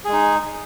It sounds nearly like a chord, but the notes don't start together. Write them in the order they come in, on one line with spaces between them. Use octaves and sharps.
G#4 G#3 D#4